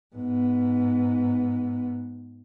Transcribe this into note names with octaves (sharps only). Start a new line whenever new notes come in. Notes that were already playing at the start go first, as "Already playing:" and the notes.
G#2 B3